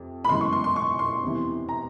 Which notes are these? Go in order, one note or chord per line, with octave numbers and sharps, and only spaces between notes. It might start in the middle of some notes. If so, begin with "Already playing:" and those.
Already playing: F2 C3
B5
F#2 C#3 E3 G#3 C6
C#6
C6
C6
C#6
C6
E2 C3 E3
A#5